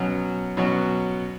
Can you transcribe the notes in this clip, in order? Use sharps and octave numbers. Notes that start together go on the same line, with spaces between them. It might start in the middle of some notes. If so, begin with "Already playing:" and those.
Already playing: B2 F#3 C#4 F#4
B2 F#3 C#4 F#4